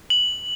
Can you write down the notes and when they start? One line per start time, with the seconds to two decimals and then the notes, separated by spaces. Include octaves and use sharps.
0.10 F#7